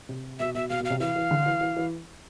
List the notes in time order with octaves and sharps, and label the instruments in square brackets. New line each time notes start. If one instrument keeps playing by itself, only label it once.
[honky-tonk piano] C3
[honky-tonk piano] B2 [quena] E5
[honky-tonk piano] B2 [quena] E5
[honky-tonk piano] B2 [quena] F5
[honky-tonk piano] B2 [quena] F5
[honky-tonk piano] C3
[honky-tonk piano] E3 [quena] F5
[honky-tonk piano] E3
D3
E3
E3
E3